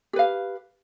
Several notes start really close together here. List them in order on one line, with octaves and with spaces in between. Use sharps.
G4 B4 F5